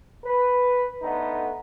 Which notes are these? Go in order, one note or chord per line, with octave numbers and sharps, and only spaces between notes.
B4
D3 A3 B3 D#4